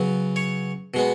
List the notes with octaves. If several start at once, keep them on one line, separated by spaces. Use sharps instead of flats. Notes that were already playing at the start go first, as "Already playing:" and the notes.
Already playing: C#3 F#3 B3
C#5
B2 G#3 B3